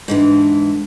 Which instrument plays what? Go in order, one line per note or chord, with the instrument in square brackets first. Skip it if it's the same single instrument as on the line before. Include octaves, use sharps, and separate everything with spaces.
[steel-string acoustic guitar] G#2 D3 E3